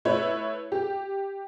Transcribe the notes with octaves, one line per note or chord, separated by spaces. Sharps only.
A3 E4 B4 C#5
G4